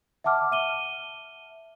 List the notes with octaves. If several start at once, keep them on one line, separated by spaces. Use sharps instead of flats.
E5 F#5 A5 D6 F6
E5 D#7 G7